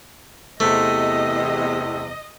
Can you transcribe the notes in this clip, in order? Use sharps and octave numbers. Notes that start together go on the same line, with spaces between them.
E2 C3 A3 D#5